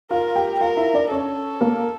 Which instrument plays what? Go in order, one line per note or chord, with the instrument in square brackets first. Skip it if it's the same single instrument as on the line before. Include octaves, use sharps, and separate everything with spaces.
[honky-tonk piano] F4 F5 [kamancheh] A#4
[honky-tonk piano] G4 G5
[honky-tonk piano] F4 F5 [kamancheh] A#4
[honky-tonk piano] E4 E5
D4 D5
[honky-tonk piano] C#4 C#5 [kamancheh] A4
[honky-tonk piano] A#3 A#4